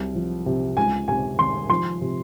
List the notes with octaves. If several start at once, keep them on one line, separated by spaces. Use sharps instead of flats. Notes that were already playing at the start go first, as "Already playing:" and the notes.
Already playing: C2 F#3
F3
C3
C#2 G#5
C3 G#5
D#3 C6
F3 C6
C3